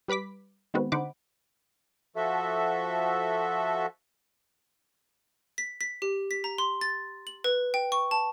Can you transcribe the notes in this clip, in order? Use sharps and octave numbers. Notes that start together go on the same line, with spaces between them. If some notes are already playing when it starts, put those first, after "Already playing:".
G3 B4 B5 D6 B6
D#3 G#3 B3 C4 F#4 B4
D3 D#4 C5 F#5 B5 D6
F3 F#4 A4 E5
B6
B6
G4
B6
A#5
C6
A6
F#7
B4
G5
C#6
A5